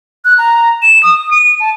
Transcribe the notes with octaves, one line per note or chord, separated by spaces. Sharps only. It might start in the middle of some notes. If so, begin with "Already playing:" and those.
F#6
A#5
E7
D#6
D#7
A5